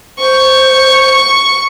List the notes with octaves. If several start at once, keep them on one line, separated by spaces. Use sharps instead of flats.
C5 C#6